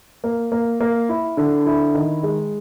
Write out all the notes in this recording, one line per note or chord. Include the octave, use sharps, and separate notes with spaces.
A#3
A#3
A#3
E4
D3
E4
D#3
G#3